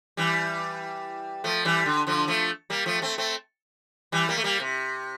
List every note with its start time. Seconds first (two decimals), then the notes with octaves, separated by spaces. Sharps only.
0.17 E3 G3
1.44 F3 A3
1.65 E3 G3
1.86 D3
2.07 D3 F3
2.28 F3 A3
2.70 G3 A#3
2.86 F3 A3
3.02 A3 C4
3.18 A3 C4
4.12 E3 G3
4.28 G3 A#3
4.37 A3
4.44 G3 A#3
4.60 C3